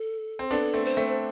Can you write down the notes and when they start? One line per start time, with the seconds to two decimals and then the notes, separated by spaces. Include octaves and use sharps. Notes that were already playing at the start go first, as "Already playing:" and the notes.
Already playing: A4
0.39 C4
0.50 B3 D4 A4
0.74 A3 C4
0.85 C5
0.97 A3 C4